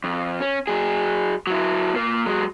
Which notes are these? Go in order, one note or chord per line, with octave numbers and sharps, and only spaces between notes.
F2
C#4
F#3 G#4
F#3 E4
A#2 A#3
F#3 G#3